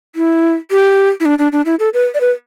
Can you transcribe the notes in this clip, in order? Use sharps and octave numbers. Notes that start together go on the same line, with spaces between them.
E4
G4
E4
D4
D4
D4
E4
A4
B4
D5
B4